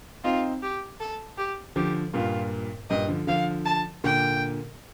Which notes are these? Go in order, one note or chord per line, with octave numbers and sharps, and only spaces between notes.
C4 D#4 F4
G4
A4
G4
D3 F3 G4
G2 A#2 F4
G2 A#2 D#5
D3 F3
D3 F3 F5
A5
A#2 D3 G5